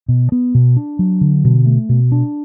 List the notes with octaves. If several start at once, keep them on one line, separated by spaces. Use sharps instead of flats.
B2
B3
B2
D4
F#3
D3
B2
A3
B2
D4